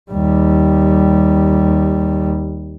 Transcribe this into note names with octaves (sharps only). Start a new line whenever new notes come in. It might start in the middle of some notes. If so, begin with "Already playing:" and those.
D#2 G3